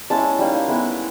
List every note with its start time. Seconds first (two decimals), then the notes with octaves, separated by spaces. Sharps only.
0.10 G#3 C#4 E4 A5
0.39 G3 A#3 D#4
0.68 G#3 B3 E4